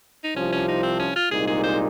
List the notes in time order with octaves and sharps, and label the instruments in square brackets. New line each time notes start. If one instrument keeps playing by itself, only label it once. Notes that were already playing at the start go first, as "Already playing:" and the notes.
[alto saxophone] D#4
[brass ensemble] C2 C3 F3 [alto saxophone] C#4
[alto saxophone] C#4
D#4
C4
C#4
F4
[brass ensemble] C2 A#2 G#3 D#4 [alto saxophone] G#4
[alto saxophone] G#4
C5